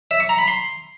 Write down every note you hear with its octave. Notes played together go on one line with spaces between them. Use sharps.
E5
C#6
A#5
B5
C6